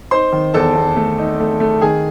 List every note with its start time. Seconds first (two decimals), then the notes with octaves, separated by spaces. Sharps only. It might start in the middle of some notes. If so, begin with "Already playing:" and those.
0.11 D#4 C5 C6
0.33 D#3
0.54 E2 A4 A5
0.76 E2
0.97 A3
1.18 D#4
1.40 A3
1.60 A3
1.81 D#3 G#4 G#5